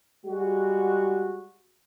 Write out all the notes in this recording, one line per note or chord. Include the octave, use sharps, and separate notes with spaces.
G3 G#3 F#4